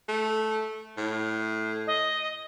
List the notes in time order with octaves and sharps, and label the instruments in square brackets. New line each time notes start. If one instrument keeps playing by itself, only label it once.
[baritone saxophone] A3
A2
[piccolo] D#5